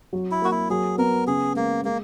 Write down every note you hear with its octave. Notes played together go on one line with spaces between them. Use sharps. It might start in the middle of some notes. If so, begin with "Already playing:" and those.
F#3
E4
A#3 F#4
E4
F#3 G#4
B3 A#4
C#3 G#4
G#3 A#3
G#3 A#3